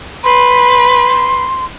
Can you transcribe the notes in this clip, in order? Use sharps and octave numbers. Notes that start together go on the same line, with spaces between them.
B4 C6